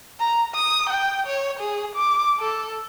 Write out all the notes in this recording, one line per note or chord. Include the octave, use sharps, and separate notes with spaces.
A#5
D#6
G5
C#5
G#4
D6
A4